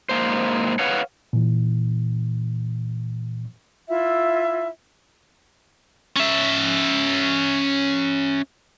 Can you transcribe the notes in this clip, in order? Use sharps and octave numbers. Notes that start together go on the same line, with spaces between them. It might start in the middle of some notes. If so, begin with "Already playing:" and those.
G#2 A#3 C5
B4 C#5 F5 F#5
A#2 E3
E4 F4 E5
C#4 E5